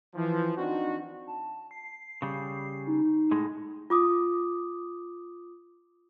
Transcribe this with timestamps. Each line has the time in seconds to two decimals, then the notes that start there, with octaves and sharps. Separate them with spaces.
0.15 E3 F3
0.57 C4 D4 D#4 F#4
1.27 A5
1.71 C7
2.22 C#3 G3
2.87 D#4
3.31 A2 G#3
3.90 F4 D6 D#6